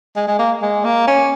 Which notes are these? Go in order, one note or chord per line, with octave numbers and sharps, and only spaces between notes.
G#3
G#3
A#3
G#3
A#3
C#4